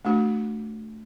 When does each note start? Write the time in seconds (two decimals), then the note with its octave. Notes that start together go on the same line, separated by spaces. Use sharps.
0.05 A3 D4 F#4